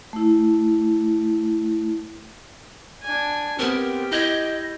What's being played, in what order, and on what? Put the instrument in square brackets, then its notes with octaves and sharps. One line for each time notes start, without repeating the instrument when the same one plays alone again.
[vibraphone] A3 E4
[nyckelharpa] D4 G#5
[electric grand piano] B3 C4 [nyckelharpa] G4 [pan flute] A#4
[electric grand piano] E4 G6 G#6 [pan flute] D#5